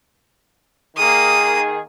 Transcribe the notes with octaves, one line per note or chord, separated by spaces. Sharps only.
D#3 A#3 G#4 D#6